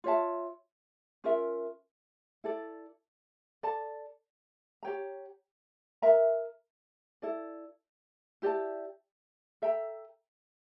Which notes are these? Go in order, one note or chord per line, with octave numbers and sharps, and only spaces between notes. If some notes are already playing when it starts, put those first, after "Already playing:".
F4 C#5 E5 A5
C#4 F4 A#4 E5
E4 A4 D5
A4 D5 A5
G4 C#5 G5 A#5
A#4 E5 A#5
E4 A4 D5
E4 G4 D5 A5
A4 E5 G5 A#5